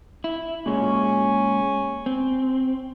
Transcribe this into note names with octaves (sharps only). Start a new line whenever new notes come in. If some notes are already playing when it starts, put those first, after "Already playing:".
E4
A#2 G#3 C#4
C4